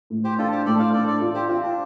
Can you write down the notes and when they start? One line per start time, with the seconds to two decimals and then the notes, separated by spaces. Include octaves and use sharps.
0.10 A2
0.24 G4 C5
0.38 D4 F4 A4
0.52 G4 C5
0.65 A2 A4 D5
0.79 C5 F5
0.93 D4 A4 D5
1.07 A4 D5
1.21 F4
1.34 G4 C5
1.48 C4 F4
1.62 D4